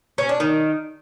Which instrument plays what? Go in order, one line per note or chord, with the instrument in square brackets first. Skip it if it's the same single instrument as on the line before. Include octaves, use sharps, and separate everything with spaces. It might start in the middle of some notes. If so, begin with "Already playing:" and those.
[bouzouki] C#4
D4
D#3